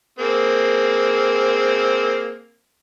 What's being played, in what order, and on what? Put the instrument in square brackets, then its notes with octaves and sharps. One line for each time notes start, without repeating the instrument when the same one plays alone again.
[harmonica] A#3 C4 G#4